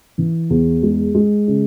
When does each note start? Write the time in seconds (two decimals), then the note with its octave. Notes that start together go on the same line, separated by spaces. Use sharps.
0.18 E3
0.50 E2
0.83 G#3
1.15 G#3
1.48 C#3